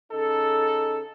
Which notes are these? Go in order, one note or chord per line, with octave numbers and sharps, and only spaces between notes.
C#3 D#4 A4